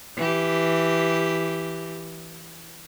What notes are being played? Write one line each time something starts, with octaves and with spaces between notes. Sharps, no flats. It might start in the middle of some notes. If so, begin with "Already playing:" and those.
E3 G4